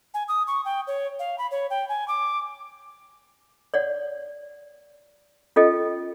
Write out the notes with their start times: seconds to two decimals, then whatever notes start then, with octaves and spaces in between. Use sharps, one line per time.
0.14 G#5
0.28 D#6
0.47 C#6
0.65 G5
0.87 C#5
1.19 F5
1.38 B5
1.51 C#5
1.70 G5
1.89 G#5
2.08 D6
3.74 C#5 D5 F#5
5.56 C#4 F4 A4 D#5 G5